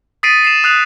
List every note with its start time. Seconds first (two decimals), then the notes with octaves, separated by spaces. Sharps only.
0.23 D#6 A6 B6 C7 D7 D#7
0.44 C7 E7
0.64 D#6 F#6 C7 F7